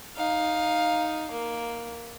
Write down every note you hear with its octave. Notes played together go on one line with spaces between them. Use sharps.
D#4 F5
A#3